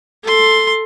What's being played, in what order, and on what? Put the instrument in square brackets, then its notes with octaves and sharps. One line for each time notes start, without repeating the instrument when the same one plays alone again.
[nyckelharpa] A4 C6